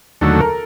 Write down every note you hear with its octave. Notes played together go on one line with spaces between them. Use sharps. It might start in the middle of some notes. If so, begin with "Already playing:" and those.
D#2 D3 F#3 A3 A4
A#4